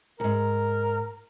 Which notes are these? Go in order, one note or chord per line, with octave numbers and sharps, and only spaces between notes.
D2 G#2 A#4